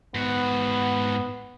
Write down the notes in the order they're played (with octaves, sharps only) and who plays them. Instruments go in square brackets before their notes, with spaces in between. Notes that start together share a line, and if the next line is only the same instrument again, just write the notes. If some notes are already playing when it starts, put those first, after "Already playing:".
[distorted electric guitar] G#2 F#4 [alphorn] B3